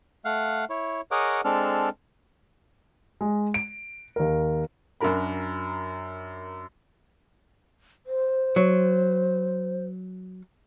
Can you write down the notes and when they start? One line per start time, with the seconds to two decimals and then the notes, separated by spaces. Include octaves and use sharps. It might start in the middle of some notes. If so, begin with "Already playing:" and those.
0.25 A3 F5 F#5
0.70 E4 C#5
1.11 G#4 A#4 C#5 D#5 F#5 D6
1.45 G#3 C4 D4 A4 F6
3.21 G#3
3.54 D7
4.16 D#2 A#4
5.01 F#2 D4 F#4 A#4 B5
8.06 C5
8.56 F#3